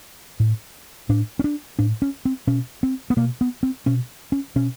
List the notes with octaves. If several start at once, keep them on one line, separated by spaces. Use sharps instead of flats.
A2
A2 D4
C#4
D4
A2 D4
C#4
C4
B2 C#4
C4
B3
B2 A#3
B3
C4
B2 C#4
C#4
B2 C#4